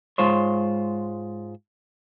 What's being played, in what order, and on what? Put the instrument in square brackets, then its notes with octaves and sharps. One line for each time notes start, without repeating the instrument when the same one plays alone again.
[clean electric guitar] G#2 G#3 F4 C5 C#5